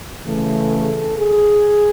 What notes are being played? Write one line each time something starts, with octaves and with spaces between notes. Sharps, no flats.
C#3 E3 A3
A4
G#4